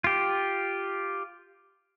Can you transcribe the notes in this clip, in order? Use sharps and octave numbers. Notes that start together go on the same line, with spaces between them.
F4 G4